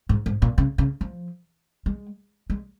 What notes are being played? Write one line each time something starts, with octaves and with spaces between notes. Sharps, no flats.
G#2
G#2
A#2
C#3
C#3
F3
G#3
G#3